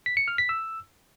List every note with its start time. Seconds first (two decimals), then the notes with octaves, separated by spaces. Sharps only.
0.06 B6
0.17 C#7
0.28 F6
0.38 B6
0.49 E6